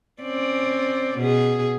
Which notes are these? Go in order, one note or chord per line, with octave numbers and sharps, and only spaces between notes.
C4 C#4 D5
B2 G#4